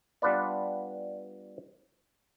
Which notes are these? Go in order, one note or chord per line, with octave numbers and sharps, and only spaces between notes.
G3 B3 D4 F4 B4 D5